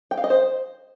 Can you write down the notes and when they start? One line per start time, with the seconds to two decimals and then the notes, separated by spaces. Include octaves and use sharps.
0.11 G5
0.17 F5
0.24 D#5
0.30 C5